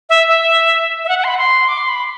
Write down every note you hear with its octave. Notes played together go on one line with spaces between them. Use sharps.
E5
E5
E5
F#5
F#5
C6
B5
C6
D6
C6
B5